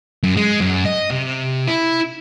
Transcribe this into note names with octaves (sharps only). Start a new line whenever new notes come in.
F#2
G#3
F#2
D#5
C3
E4